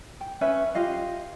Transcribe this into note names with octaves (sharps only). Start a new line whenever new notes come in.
G5
C#4 B4 E5
F4 G4 D#5 F5